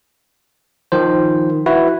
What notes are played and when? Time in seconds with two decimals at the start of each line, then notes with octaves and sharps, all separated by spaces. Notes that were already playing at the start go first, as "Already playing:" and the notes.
0.92 D#3 F3 C5
1.66 E4 F#4 B4